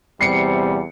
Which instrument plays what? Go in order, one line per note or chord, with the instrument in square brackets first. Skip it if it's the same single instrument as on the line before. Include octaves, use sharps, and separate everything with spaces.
[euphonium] E2 [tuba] C3 [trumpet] G3 [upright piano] C7 C#7